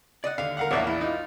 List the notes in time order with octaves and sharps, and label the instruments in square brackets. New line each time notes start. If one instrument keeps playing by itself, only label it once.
[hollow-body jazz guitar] D5 D#5 F#5
[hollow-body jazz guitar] D#2 D3 [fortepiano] F5
[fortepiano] A#4 F5 F#5
[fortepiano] A#1 E2 A#3 [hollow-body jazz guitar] C#5 D5 E5
[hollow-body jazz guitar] E4
[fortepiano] D#4 F4